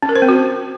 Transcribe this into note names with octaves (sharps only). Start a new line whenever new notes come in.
C#4
A#4
C5
C4
F#4